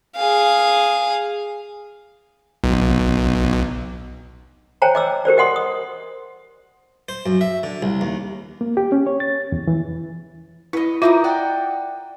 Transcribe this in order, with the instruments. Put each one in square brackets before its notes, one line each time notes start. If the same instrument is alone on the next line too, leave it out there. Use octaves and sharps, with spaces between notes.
[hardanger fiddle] G#4 F5
[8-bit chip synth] B1
[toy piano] C5 C#5 G5 A5 A#5
D#5 D6 E6
G4 A#4 C5 D5
G4 D#5 F#5 C6 D#6
D#6
[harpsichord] C5
F#2
E5
D3
C2
D#2
[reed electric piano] A#3
G4
C#4
C#5
A6
E2
E3
[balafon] E4 [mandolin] B4 D#5
[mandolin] D#4 A#4 D#6 [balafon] F4 E5 D6
[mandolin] D5 F#5 G5